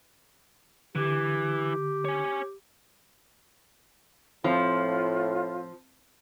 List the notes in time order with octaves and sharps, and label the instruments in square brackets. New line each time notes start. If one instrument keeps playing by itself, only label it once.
[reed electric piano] D3 [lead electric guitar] E3 [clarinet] G4
[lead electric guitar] C#5 G#5
[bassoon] A2 [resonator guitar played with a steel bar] F3 [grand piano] C4 [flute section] F4